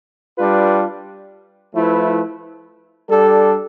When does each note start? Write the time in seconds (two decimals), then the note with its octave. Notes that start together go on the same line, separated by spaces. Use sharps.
0.37 G3 D4 F4 B4
1.73 F3 A3 E4 B4
3.09 G3 D4 A4